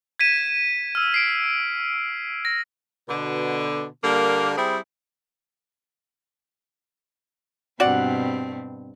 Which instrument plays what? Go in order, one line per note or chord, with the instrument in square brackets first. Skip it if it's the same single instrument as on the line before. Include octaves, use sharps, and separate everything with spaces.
[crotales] G#6 B6 D#7 E7
E6 F6
C7 D7
A#6
[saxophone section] B2 D3
D3 G3 A#3
G3 C4 E4 G#4
[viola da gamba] G2 B2 C4 [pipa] F#4 D5 F#5